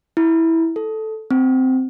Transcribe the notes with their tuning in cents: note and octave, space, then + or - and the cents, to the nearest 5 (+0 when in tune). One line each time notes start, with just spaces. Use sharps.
E4 -10
A4 -5
C4 -10